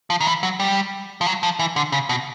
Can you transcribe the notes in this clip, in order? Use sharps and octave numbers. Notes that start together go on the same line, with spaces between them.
F3
D#3
E3
F#3
G3
F3
F#3
F3
E3
D3
C#3
B2